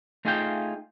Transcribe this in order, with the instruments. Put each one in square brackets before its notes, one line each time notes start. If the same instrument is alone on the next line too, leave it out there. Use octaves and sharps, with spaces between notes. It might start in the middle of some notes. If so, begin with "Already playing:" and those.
[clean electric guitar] A3 D#4 F4 G#4 F5 G5